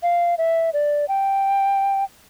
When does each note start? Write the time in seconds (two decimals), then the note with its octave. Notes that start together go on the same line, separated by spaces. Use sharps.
0.03 F5
0.38 E5
0.73 D5
1.08 G5